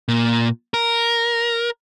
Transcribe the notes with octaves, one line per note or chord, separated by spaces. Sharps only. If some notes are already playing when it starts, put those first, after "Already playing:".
A#2
A#4